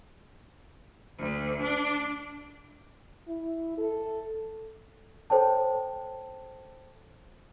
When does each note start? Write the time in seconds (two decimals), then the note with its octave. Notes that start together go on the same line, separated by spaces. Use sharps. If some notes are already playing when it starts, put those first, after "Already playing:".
1.17 D2
1.63 D4
3.28 E4
3.78 A4
5.30 A4 C5 C#5 G5 A5